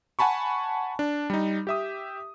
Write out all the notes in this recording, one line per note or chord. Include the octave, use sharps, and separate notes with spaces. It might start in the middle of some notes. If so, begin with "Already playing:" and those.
F#5 G#5 A5 B5 C#6
D4
G3 D#4
G4 E5 D#6